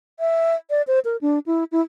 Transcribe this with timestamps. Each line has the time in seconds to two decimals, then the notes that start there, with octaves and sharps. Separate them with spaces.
0.20 E5
0.70 D5
0.87 C5
1.05 A#4
1.21 D4
1.46 E4
1.72 E4